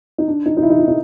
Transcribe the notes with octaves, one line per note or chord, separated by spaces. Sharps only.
D#4
D4
D#4
D#4
E4
D#4
E4
D#4